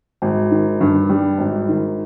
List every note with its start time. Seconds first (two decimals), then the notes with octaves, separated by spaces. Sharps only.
0.22 G#1
0.51 D#3
0.81 G2
1.09 G3
1.38 G#1
1.68 D#3